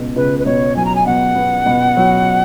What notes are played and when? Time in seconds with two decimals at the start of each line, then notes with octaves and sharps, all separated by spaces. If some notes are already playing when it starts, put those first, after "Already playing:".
Already playing: C#2 B2
0.16 C#2 B4
0.39 B4
0.46 B2 C#5
0.76 F#3 G#5
0.85 A#5
0.96 G#5
1.06 B2 F#5
1.36 B3
1.66 B2
1.97 F#3